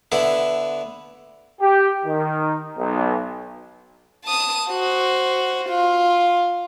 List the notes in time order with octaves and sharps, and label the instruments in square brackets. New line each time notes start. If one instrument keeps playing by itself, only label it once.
[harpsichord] D3 B3 E4
[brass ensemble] G4
D#3
B1
[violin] A5 D#6
F#4 C5
F4